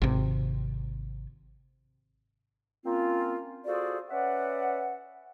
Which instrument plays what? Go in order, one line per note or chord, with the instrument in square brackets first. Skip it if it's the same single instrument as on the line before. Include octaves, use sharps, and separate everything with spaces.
[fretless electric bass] G#1 C3
[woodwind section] A#3 C4 C#4 F4
F4 F#4 G#4 A4 C5 D5
C#4 B4 D5 E5 F#5